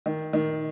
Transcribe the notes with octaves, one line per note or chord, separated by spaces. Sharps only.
D#3
D#3